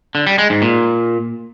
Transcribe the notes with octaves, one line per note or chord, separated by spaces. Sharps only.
D3
G3
G#3
G#2
A#2